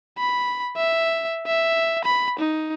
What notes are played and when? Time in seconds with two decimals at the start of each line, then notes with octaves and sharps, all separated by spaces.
0.18 B5
0.77 E5
1.47 E5
2.04 B5
2.39 D#4